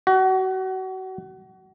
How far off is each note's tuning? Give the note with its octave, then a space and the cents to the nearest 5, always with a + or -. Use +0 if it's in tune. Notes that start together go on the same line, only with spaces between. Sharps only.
F#4 +30